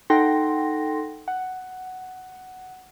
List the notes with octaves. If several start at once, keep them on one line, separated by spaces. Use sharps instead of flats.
D#4 A4 F#5 G5 C6 A#6
F#5